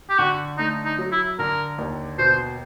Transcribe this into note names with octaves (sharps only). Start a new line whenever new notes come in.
G4
D3 F#4
A3 D#4
D#4
F#3
E4
D3 A#4
D#2
B2 C5